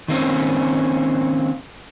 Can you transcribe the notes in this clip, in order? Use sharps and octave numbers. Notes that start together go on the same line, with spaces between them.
D#3 A#3 C4 C#4